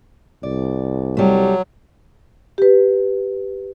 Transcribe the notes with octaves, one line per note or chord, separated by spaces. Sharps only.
C2 D5
F#3 G3 A3
G4 B4